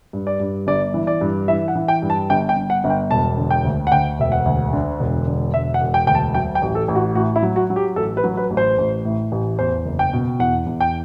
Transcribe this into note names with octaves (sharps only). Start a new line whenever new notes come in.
G2
D5
G2
G1 D5
E3
D5
G2
E3 E5
F#5
E3
G5
G2
A5
G1 G5
G5
G1
F#5
G1
G5
E1 A5
D3
G5
D2
F#5
D2 G5
E1 E5
F#5
D2
D3
E1
D3
E1 E5
F#5
E1
G5
D2 G5
A5
F#3 G5
G5
A1
A4
A1
F#4
A2 F#4
E4
F#3
F#4
F#3
G4
A1 A4
B4
F#3
B4
A1
C5
A1
A2
A1
E2 C5
F#1
G5
B2
E2 F#5
E2
G5